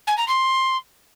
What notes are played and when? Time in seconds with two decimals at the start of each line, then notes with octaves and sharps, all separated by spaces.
0.07 G#5
0.18 A#5
0.28 C6